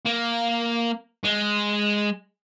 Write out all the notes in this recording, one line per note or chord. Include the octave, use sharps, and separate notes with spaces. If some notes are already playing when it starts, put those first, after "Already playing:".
A#3
G#3